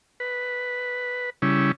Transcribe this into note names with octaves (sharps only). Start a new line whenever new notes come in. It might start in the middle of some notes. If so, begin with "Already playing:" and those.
B4
C#3 G3 C#4 E4